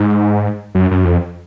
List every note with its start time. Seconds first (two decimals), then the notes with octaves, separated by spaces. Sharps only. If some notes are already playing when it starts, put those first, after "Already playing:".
Already playing: G#2
0.75 F#2
0.91 F#2
1.05 F2